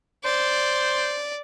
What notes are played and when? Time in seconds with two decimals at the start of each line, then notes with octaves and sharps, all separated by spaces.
0.25 C5 D5